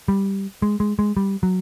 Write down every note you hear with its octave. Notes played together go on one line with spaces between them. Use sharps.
G3
G#3
G#3
G#3
G3
F#3